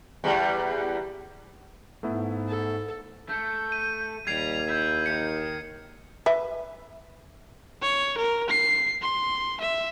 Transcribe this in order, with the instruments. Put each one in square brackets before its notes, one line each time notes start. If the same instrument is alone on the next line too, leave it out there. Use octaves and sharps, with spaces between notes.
[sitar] E2 G3
[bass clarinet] G#2 [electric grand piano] A3 B3 E4
[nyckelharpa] A4
[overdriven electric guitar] A3 [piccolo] G6
[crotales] D#7
[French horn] D#2 [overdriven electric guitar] G3 [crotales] G#6 C7 D#7 [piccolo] F7
[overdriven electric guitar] E4 [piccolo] G6
[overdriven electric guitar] D#3 [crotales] C#7
[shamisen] B4 E5
[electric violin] C#5
A#4
C7
C6
E5